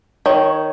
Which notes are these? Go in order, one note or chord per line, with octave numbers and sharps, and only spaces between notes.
D#3 C#5
C#5
C#5